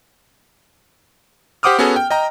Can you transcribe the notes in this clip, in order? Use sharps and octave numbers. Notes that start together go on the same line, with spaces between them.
G4 C5 F#5 D6 D#6 F6
B3 C#4 F#4 G#4 A4
G5
D#5 G5 A#5